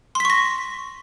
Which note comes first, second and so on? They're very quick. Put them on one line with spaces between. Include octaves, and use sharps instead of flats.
C6 B6 C#6 A#6